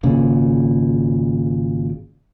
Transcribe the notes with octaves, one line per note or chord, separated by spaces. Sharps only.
G#1 A#2 C#3